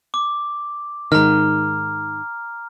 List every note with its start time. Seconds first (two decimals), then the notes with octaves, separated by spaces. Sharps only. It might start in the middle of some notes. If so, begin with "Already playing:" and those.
0.14 D6
1.12 G#2 D#3 A#5 F6